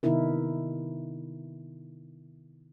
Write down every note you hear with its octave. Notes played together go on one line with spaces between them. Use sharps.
C3 D#3 B3 D#4 E4 A#4